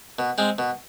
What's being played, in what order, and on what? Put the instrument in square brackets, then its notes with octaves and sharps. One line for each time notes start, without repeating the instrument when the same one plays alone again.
[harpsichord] B2
G#3 C4
B2